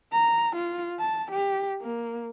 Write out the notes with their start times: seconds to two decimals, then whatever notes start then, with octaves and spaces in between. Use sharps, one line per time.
0.13 A#5
0.56 F4
1.00 A5
1.31 G4
1.81 A#3